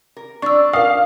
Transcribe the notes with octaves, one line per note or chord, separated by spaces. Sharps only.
A#4
D4 C#6 E6
A#4 F5 D#6